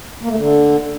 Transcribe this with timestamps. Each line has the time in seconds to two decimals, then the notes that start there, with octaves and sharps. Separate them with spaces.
0.23 A#3
0.30 A3
0.36 D3